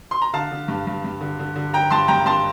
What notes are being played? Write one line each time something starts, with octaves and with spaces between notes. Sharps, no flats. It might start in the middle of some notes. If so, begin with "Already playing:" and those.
C6
A#5
D3 F5 A5
D3
G2
G2
G2
D3
D3
D3
D3 G5 A#5
G2 A5 C6
G2 G5 A#5
G2 A5 C6